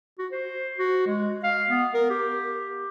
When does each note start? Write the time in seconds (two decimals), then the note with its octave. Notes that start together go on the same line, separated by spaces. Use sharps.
0.19 F#4
0.32 C5
0.78 F#4
1.07 G#3
1.44 F5
1.70 B3
1.94 A#4
2.10 G4